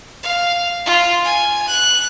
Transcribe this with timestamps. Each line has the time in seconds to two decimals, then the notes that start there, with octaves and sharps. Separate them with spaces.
0.23 F5
0.86 F4
1.24 G#5
1.67 F#6